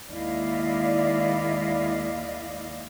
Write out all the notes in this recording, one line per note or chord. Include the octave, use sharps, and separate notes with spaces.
D#2 G#3 E4 D5 D#5 F5